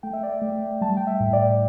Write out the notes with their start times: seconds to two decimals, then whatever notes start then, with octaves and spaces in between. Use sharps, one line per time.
0.03 A3 G5
0.13 E5
0.23 D5
0.33 E5
0.42 A3
0.81 G3 A5
0.97 G5
1.07 E5
1.20 A2
1.33 D5